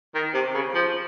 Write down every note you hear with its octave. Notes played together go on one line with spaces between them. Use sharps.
D#3
C3
C#3
F3